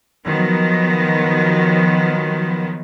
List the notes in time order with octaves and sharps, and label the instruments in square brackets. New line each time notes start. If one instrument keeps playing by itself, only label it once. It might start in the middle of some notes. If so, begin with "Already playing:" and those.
[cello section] D#3 F3 F#3 B3